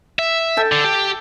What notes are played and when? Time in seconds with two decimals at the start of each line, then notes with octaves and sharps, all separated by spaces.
0.19 E5
0.57 A4 G5 A5
0.72 D3
0.84 G4